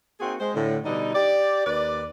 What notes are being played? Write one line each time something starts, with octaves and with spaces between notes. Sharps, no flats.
A#3 C4 D#4 F#4 G#4
G#3 C5
A2 D3
B2 D3 G3 D#4
G4 D5
D#2 B4 D5